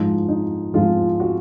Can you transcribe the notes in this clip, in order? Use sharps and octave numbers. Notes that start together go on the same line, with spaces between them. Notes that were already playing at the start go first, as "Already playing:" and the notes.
Already playing: G#2 F3 G#3 D#4
D#4
G#2 F3 G#3 F4
F#4